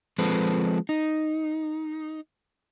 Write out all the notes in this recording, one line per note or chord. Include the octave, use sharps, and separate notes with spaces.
F3 G#3 C4 A4 B4
D#4